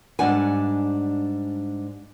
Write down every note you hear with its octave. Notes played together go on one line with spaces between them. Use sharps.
G#2 G3 D4 F#5 G#5